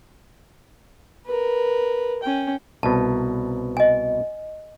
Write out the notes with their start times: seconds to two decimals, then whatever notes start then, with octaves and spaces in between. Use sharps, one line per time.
1.26 A#4 B4
2.23 C#4 G5
2.83 C2 B2 A5
3.77 D#5 G#5